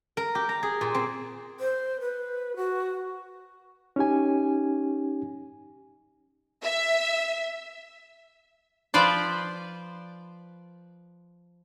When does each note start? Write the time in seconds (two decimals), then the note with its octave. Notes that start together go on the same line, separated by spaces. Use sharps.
0.17 A#4
0.35 G4
0.49 A#5
0.63 G#4
0.81 A#2
0.94 C4
1.60 C5
2.01 B4
2.57 F#4
3.96 C#4 D#4 G4 G#5
6.62 E5
8.94 F3 B4 C5 D5